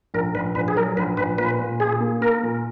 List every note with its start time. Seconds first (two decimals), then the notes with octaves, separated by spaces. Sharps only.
0.14 A#1 A#4
0.35 A#1 B4
0.55 A#1 B4
0.68 G#4
0.77 F#3 A#4
0.97 A#1 B4
1.17 A#1 B4
1.38 A#2 B4
1.59 A#2
1.80 A#2 G#4
2.00 A#3
2.21 A#3 A#4
2.43 A#2